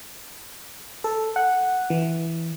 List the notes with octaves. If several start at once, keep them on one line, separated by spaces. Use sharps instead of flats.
A4
F#5
E3